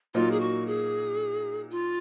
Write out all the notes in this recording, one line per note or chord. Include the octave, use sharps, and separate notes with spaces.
A#2 F#3 A#3 D#4 F4
G#4
F#4
G#4
F4